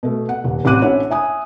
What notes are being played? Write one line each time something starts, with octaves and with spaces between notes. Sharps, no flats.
B2 A3
F#5
D#1
A1 C4 G4 D6 F#6 D#7
C#4 D4 E4 C#5 F#5
E5 G#5 D#6